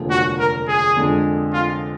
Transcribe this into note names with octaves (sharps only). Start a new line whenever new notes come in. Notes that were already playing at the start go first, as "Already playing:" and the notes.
Already playing: F1 D#2 D3 F3 G#3
F#4
A#4
G#4
F2 D3 G#3
F4